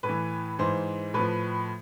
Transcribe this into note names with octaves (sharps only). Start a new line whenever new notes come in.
A2 B4
E3
G#2 E3 C5
A2 F3 B4